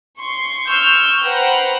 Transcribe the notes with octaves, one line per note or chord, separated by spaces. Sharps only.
C6 C#6
C#6 E6 F6 G6
B4 C5 F#5 G5 A#5 F#6